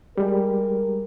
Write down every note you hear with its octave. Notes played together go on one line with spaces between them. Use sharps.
G3 G#3 A#4